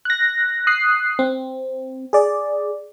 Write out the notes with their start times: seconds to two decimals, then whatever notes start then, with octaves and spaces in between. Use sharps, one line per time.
0.05 F#6 A#6
0.67 D#6 F#6 C7
1.19 C4
2.13 G#4 D5